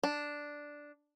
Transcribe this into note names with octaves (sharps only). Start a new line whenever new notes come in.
D4